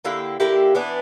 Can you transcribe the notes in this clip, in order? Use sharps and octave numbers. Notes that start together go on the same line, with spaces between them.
D3 A#3 E4 G4
D3 A#3 E4 G4
E3 B3 D4